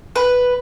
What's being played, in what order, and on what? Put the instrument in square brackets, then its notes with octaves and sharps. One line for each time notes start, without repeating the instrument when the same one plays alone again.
[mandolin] B4